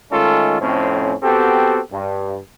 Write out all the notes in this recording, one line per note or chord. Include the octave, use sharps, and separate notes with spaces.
D#3 G#3 A3 C#4 F4 A4
F2 A2 C4 C#4
B3 C4 F#4 G4 A4
G2